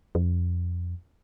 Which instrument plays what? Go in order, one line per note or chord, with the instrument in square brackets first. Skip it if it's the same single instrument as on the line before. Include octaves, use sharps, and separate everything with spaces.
[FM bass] F2